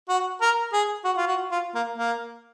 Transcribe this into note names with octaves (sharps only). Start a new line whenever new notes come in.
F#4
A#4
G#4
F#4
F4
F#4
F4
A#3
A#3